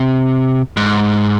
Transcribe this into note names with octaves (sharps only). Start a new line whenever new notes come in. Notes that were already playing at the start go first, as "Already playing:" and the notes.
Already playing: C3
G#2